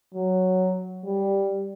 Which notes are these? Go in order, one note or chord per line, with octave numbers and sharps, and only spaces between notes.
F#3
G3